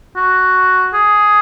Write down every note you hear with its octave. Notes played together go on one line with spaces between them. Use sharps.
F#4
G#4